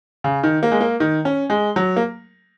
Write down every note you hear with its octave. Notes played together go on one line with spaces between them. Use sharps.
C#3
D#3
A#3
G#3
A#3
D#3
C#4
G#3
F#3
A#3